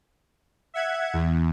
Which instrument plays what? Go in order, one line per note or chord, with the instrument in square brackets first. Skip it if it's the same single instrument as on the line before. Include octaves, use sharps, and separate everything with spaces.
[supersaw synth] E5 F#5 G#6
E2